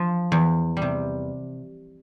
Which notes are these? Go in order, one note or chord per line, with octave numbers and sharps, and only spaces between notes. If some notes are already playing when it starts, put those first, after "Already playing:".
Already playing: F3
E2
G3
C3